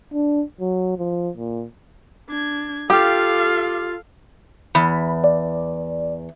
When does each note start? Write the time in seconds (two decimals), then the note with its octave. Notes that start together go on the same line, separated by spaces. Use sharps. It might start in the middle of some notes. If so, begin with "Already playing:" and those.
0.13 D4
0.61 F#3
0.98 F3
1.37 A#2
2.29 D4 G#6
2.90 F4 G4 A4 F5 D6
4.75 E2 B5
5.24 D5